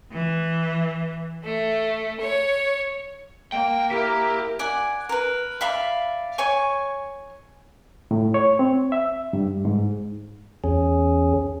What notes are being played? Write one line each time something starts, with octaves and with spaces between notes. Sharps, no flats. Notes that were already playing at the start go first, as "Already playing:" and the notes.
E3
A3
C#5
A#3 G5
E4 G4 A#4
D5 F#5 G#5
A#4 B4
D5 E5 F5 B5
C#5 G#5 C#6
A2
C#5
C4
E5
G2
G#2
E2 C#4 G#4